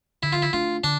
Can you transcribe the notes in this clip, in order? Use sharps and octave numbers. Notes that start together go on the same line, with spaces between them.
D3 E4
F4
E4
A3 D4 F4
D3 D4